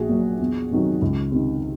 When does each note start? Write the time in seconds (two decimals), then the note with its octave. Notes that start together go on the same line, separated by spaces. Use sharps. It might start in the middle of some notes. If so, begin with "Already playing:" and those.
Already playing: A#1 F#4 G#4
0.09 A#2 F#3
0.39 E2
0.71 C3 D#3 F#3
1.02 C#2
1.32 C3 D#3